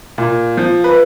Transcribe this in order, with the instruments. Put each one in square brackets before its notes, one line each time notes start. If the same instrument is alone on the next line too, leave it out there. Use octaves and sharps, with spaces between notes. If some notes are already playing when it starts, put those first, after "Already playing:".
[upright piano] A#2
F3
B4